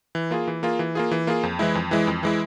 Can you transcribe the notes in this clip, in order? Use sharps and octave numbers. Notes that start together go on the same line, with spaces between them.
E3
A#3 F4 G#4
E3
A#3 F4 G#4
E3
A#3 F4 G#4
E3
A#3 F4 G#4
F2
E3 G#3 E4
F2
E3 G#3 E4
F2
E3 G#3 E4